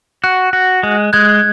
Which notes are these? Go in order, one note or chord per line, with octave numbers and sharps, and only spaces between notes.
F#4 F#6
F#4
G#3
G#3 F#6 G#6